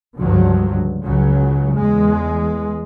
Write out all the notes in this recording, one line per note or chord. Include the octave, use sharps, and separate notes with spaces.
C#2 G2 D3 F3 F#3
C#2 C#3 F#3
E2 G#3